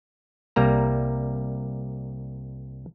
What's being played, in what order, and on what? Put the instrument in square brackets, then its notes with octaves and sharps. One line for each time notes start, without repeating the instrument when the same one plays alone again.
[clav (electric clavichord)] C2 G3 A#3 A#5